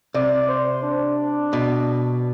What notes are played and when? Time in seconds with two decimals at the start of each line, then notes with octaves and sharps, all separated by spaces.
0.14 C3 D5
0.48 C5
0.83 D4
1.53 B2